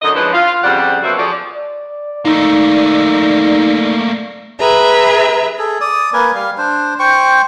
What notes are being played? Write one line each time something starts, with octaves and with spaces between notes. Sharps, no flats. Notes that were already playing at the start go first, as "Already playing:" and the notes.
F#2 D3 D#5
F3 G#3 C#4 D4 E4 B4
F4
F2 C#3 G3 C5 D5 F#5
B2 F3 F#3 A#3 F#4 E5
F3 G#4 A4 C#5 D5
D5
A3 A#3 D#4
G#4 B4 E5 A#5
G#4 A4
D5 D#6
A#3 A#4 B4 G#5
G3 F5
D4 C5
C5 G5 C#6